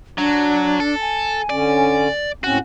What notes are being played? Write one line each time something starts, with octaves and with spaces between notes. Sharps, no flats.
F#3 D4
A4
G#5
D3 C#4 D5
A2 C4 C#4 F#4